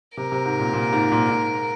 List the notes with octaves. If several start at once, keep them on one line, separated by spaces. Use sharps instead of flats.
C3 A#4
C3
G#2
A#2
A#2
G#2
A#2
G#2